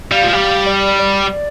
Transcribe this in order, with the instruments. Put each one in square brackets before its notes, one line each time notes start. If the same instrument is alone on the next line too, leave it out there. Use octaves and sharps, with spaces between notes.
[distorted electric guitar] G3 [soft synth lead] F5
[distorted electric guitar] F3
[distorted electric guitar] G3 [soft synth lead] F5
[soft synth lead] D5
D5